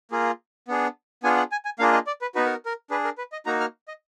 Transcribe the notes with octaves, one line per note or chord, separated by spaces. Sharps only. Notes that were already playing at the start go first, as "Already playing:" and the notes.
A#3 F4 G#4
B3 D4 G#4
B3 D4 F4 G#4 G#5
F#5
G#5
G#5
A#3 D4 F4 G#4 F5
D#5
D5
B4
B3 D#4 F#4 B4
A#4
A#4
D4 G#4 B4
A#4
B4
D#5
A#3 D#4 F#4 A#5
F6
D#5